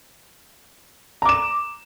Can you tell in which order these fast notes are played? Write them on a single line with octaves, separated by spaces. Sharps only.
A#5 D6 E7